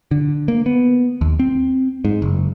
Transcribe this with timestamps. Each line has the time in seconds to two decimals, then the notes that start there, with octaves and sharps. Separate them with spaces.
0.11 D3
0.48 A#3
0.66 B3
1.21 D#2
1.39 C4
2.05 G#2
2.22 F#1